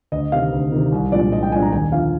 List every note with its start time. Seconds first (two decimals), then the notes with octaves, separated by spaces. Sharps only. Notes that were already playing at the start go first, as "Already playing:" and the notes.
0.12 D2 D#5
0.32 C3 D#3 F5
0.52 D2
0.72 C3 D#3
0.92 C2
1.12 A#2 F3 G#3 D4 D5
1.32 C2 D#5
1.43 G5
1.52 A#2 F3 G#3 D4 G#5
1.62 A#5
1.72 D#2 G#5
1.92 D3 F3 F5